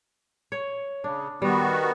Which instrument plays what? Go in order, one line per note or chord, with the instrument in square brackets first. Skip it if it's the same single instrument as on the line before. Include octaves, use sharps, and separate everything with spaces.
[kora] C#5
[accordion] C#3 [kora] D4
[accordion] D#3 B3 F#4 [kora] G3